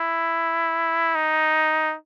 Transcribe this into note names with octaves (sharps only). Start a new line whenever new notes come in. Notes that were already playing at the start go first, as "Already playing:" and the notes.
Already playing: E4
D#4